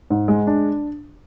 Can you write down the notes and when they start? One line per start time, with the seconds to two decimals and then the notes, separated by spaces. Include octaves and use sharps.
0.10 G#2
0.28 G#3
0.47 D4